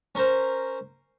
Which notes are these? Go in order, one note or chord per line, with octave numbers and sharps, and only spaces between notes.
C#4 A#4 C5